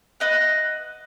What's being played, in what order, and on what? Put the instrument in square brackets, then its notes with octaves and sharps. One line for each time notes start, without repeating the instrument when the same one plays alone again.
[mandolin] B4 D#5 F#5